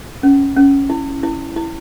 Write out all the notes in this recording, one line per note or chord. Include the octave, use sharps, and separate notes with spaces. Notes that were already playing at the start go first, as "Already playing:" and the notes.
C#4
C#4
E4
E4
E4